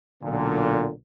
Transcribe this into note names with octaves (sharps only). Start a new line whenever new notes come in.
B1 A#2 D3